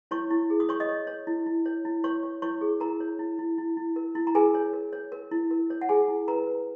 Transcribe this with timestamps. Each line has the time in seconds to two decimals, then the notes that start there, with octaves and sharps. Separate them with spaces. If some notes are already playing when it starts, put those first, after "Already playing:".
0.11 E4 C#5 C#6
0.31 E4
0.50 G#4
0.60 D#6
0.69 C#5 C#6
0.80 D#5 D#6
0.89 C#5
1.07 C#5
1.27 E4
1.46 E4
1.66 C#5
1.85 E4
2.04 C#5 C#6
2.23 C#5
2.42 E4 C#5 C#6
2.61 G#4
2.80 E4 A#4 A#5
3.00 C#5
3.19 E4
3.39 E4
3.58 E4
3.77 E4
3.96 A#4
4.15 E4
4.27 A#5
4.35 G#4 A#4 G#5
4.55 C#5
4.73 A#4
4.93 C#5
5.12 A#4
5.31 E4
5.51 A#4
5.70 C#5
5.81 F#5
5.89 G#4 G#5
6.08 E4
6.28 A#4 B4 A#5
6.47 B4